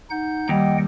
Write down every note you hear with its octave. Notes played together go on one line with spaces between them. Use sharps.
D#4 F#5 G6
D#2 G3 D#5 F#5 G5